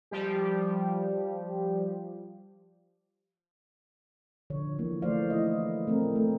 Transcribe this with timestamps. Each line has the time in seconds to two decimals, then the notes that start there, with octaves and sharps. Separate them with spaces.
0.11 F3 G3 G4
4.50 D3 F3 C#5
4.78 E3 F3 A#3
5.02 E3 A3 C5 D5 F5
5.30 E4 D#5
5.87 A3 C4 A#4
6.16 A3